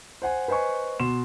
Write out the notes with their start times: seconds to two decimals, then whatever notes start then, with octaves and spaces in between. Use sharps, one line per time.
0.22 C5 F#5 G#5
0.48 B4 C5 D#5 G#5 C#6
1.00 B2 C6 E7